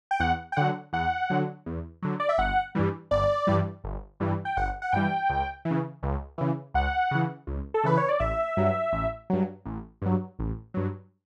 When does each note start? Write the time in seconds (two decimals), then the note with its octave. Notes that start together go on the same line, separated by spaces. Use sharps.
0.11 G5
0.20 E2 F#5
0.52 G5
0.57 D3 F#3 F#5
0.93 E2 F#5
1.30 D3 F#3
1.66 E2
2.02 D3 F#3
2.20 D5
2.29 E5
2.38 G1 F#5
2.75 G2 E3 G3
3.11 G1 D5
3.47 G2 E3 G3
3.84 G1
4.20 G2 E3 G3
4.45 G5
4.57 G1 F#5
4.82 F#5
4.92 G2 E3 G3 G5
5.29 C#2
5.65 E3
5.71 C#3
6.03 C#2
6.38 C#3 E3
6.74 C#2 F#5
7.11 C#3 E3
7.47 C#2
7.74 A4
7.84 C#3 E3 B4
7.97 C#5
8.09 D5
8.20 A1 E5
8.57 G2 F#3
8.92 A1
9.30 G2 F#3
9.65 A1
10.02 G2 F#3
10.39 A1
10.74 G2 F#3